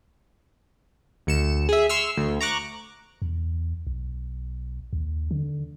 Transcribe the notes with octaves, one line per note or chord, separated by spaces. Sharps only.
D2 C#7 E7
G#4 E5
C6 C#6 E6 F6
D2
A#5 C#6 D6 F#6
E2
B1
D#2
D3